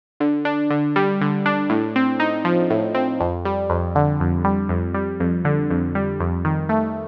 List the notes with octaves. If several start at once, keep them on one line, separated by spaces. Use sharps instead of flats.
D3
D4
D3
G3
D3
D4
A2
C4
D#4
F3
A2
C4
F2
G3
F2
D3
F2
G3
F2
G3
F2
D3
F2
G3
F2
D#3
A3